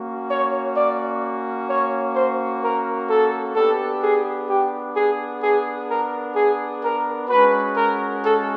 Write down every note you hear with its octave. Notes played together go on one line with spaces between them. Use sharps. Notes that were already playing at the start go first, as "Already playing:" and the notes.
Already playing: A#3 C#4 F#4
C#5
D5
C#5
C5
A#4
A4
B3 D4 G4 A4
G#4
G4
G#4
G#4
A#4
G#4
A#4
G#3 C#4 F#4 B4
A#4
A4